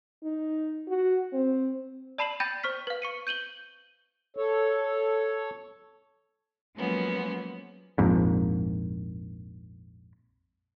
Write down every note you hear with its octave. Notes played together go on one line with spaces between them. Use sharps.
D#4
F#4
C4
D5 A5 B5 C7 E7 F#7
G5 B5 G6 A6 A#6 D#7
C5 C#6 F6 B6
B4 F5
C#6 C#7 D#7
G6 D#7 F#7 G7
A4 C#5
F3 F#3 G#3 A#3 B3 C#4
A#1 F2 G#2